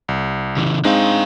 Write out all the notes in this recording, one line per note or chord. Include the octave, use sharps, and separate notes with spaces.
C2
C#3 E3
G#3 C4 D4 D#4 F5